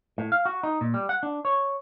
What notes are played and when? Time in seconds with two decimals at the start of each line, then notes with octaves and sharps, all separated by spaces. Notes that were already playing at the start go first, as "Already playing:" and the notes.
0.18 A2
0.32 F5
0.45 F#4
0.63 D#4
0.81 A#2
0.94 G3
1.09 F#5
1.23 D4
1.45 C#5